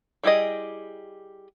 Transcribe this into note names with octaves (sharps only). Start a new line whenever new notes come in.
G3 E4 G4 G#4 D#5